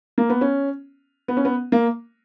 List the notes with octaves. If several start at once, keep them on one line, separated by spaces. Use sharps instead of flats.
A#3
B3
C#4
B3
C#4
B3
A#3